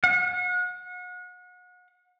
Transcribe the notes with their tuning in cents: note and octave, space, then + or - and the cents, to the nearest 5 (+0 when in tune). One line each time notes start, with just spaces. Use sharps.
F#5 -35